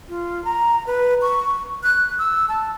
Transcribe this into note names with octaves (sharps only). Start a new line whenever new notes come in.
F4
A#5
B4
C#6
F#6
E6
A5